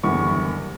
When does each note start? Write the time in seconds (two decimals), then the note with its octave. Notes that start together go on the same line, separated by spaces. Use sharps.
0.03 F#1 E2 D3 G3 C#6